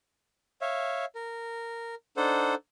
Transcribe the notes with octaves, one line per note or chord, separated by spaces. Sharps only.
C#5 E5 F5
A#4
D4 D#4 A4 C5 F#5